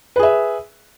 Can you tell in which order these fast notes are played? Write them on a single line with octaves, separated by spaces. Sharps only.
B4 G#4 E5